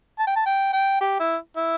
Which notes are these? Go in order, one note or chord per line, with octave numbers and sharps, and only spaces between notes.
A5
G5
A5
G5
G5
G4
E4
E4